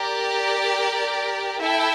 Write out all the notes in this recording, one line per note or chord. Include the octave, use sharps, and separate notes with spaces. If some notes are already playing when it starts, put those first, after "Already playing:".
Already playing: G4 A#4 D5
E4 A4 E5 G5